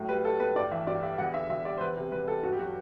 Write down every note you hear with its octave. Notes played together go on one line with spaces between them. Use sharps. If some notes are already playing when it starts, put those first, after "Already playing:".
Already playing: A2 F#3
G3 B4
G3 A4
A2 B4
G2 D5
E3 E5
G2 D5
G3 E5
E2 F#5
D3 E5
E2 E5
G3 D5
C5
E2 B4
C3
E2 B4
G3 A4
G2 F#4
G4
F#3 F#4